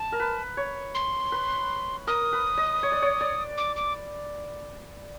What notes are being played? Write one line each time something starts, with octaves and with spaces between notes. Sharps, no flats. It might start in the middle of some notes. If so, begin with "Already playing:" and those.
Already playing: A5
A#4
B4
C#5
C6
B4
A#4 D#6
B4
D#5
C#5
D5
C#5
D5
D6
D6